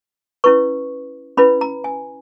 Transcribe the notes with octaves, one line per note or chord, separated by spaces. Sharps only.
C#4 E4 B4 C#6
C#4 E4 B4 B5
A#5
G#5